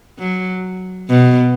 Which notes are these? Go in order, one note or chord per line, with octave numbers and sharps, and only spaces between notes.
F#3
B2